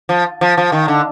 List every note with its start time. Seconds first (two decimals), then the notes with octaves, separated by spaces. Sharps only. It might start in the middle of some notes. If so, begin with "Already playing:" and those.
0.09 F3
0.41 F3
0.58 F3
0.72 D#3
0.88 D3